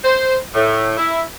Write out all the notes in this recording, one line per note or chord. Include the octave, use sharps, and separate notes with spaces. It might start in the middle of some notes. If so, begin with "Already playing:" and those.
C5
A2
E4